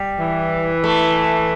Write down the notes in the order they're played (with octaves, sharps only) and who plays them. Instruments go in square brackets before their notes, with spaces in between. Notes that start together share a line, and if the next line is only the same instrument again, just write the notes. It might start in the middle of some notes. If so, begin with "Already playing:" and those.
Already playing: [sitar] G3
[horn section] E3
[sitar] A3